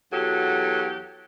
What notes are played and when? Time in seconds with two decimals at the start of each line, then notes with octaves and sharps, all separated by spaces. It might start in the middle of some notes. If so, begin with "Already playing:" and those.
0.13 E2 F#3 F#4 G4 A4